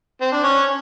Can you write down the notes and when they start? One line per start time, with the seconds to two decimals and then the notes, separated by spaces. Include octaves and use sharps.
0.21 C4
0.32 D4
0.43 C#4